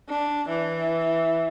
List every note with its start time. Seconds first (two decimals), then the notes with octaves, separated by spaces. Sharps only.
0.09 D4
0.48 E3